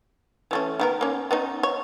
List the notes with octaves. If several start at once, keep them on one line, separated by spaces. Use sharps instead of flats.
E3 A3 C#4
D#3 B3 A#4
A#3 C#4
B3 C#4 D#4
C#5